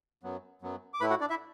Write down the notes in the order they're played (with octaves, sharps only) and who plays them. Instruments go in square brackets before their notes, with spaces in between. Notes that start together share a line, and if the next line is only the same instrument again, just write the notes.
[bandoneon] F#2 F#3 B3
F#2 F#3 B3
D6
A2 A3 E4 B4 B5
F#4 F#5
D4 D5
E4 E5